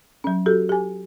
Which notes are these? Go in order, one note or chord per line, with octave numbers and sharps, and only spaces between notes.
F#3 C#4
F#4 G4 A4
G4 G#5